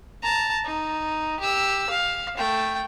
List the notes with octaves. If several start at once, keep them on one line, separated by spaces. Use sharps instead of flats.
A5 A#5
D#4
G4 E6
F5
A3 G5